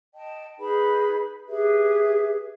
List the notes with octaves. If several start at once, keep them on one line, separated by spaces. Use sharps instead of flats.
D#5 G5 A5
D#4 G#4 B4 B5
G4 G#4 B4 E5